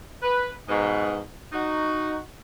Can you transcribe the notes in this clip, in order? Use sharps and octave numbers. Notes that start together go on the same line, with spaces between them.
B4
G#2 B2
D#4 F#4